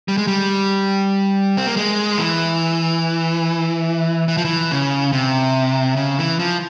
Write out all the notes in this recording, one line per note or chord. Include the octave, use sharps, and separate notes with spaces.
G3
G#3
G3
C4
A#3
G#3
E3
E3
F3
E3
C#3
C3
C#3
E3
F3